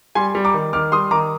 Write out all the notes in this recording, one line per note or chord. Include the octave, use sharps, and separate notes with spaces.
G3 G#5 C6
G3
A#5 D6
D#3
D#3 D6 F6
G3 C6 D#6
D#3 A#5 D6